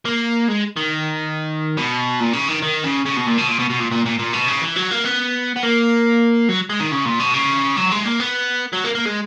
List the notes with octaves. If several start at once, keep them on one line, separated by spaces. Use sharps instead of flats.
A#3
G#3
D#3
B2
A#2
C#3
D#3
D#3
C#3
C#3
B2
A#2
B2
A#2
B2
B2
A#2
A#2
A#2
A#2
B2
C#3
E3
F#3
A#3
B3
B3
A#3
F#3
G#3
D#3
C#3
A#2
B2
C#3
F#3
G#3
A#3
B3
F#3
A#3
A#3
G#3